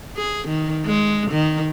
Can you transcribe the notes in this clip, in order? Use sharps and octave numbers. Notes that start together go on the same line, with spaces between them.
G#4
D#3
G#3
D#3